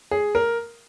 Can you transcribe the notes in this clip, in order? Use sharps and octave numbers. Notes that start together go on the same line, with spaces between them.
G#4
A#4